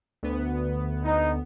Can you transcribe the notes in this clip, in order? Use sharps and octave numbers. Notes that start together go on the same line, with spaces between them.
D2 B3
D#4